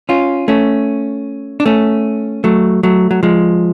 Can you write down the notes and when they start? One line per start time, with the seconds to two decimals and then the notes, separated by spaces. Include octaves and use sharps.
0.09 C#4 F4
0.48 A3 C#4
1.60 D4
1.66 A3 C#4
2.44 F#3 A3
2.83 F#3 A3
3.11 F#3
3.23 F3 G#3